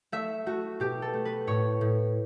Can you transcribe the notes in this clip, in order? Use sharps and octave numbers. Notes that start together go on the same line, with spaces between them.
A3 E5
A3 F#4
B2 G4
A4
A3
B4
A2 C#5
A2